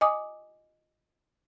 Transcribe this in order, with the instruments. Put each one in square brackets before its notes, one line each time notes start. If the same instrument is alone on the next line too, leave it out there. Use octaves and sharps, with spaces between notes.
[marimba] D#5 G#5 D6 D#6